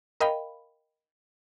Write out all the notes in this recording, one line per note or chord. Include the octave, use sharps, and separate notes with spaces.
A#4 D#5 F5 G5 B5